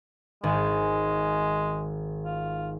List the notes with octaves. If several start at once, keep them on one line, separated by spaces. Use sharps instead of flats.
G#1 G#3
F4